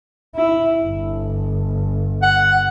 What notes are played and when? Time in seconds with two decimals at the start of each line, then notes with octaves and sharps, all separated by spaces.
0.36 E4
0.82 G1
2.23 F#5